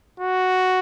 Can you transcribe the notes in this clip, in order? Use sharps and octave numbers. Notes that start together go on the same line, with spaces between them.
F#4